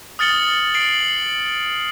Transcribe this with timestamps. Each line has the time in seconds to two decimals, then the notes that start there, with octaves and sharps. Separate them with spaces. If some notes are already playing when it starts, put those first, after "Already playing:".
0.19 D#6 F6 A6 C#7 F#7 G7
0.75 C7 D7 F#7